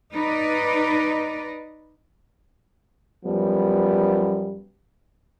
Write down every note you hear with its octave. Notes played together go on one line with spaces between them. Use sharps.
D#4 B4 D5 D#5
F#2 F3 G3 B3